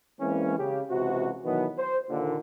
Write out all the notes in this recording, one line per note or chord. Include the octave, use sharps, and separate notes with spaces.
E3 G#3 A#3 C4 C#4
C#3 G4
C#2 C3 E3 F#4
B2 D#3 E3 F#3 B3
C5
D#2 A#2 D3